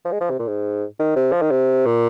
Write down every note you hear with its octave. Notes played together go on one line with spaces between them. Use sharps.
F3
G#3
F3
C3
A#2
G#2
D#3
C3
F3
D#3
C3
A#2